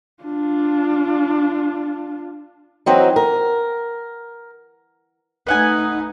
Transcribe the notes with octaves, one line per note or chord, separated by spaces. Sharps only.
D4 F4
E3 F#3 C4 D#4
A#4
A3 D#4 B4 F#5 G#5